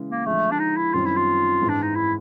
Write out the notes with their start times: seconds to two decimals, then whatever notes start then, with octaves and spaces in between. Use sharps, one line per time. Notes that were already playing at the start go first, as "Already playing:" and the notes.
Already playing: C#3 E3 G#3
0.09 A#3
0.26 D3 F3 G#3 A3
0.52 D4
0.59 D#4
0.77 E4
0.94 F#2 D#3 G3 C4 F4
1.05 E4
1.16 F4
1.62 G#2 E3 G#3
1.69 D4
1.82 D#4
1.96 E4